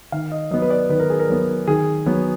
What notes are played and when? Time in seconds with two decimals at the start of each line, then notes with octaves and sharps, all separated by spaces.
0.12 D#3 F5
0.32 D#5
0.51 F#3 B3 D#5
0.62 B4
0.70 D5
0.89 D#3 B4
1.00 A#4
1.10 G#4
1.19 A#4
1.29 F#3 B3
1.67 D#3 G#4
2.06 F#3 B3